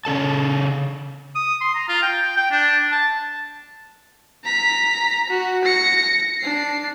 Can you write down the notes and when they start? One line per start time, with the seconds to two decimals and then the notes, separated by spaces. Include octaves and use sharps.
0.05 C#3 C#4 A4 A5
1.35 D#6
1.61 C6
1.75 A#5
1.89 F4
2.02 G5
2.37 G5
2.51 D4
2.92 A5
4.44 A#5 B6
5.29 F#4
5.64 A#6 C#7
6.40 D4 C7